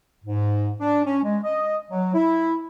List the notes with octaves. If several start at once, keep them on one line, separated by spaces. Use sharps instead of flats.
G#2
D4
C#4
G#3
D#5
F#3
E4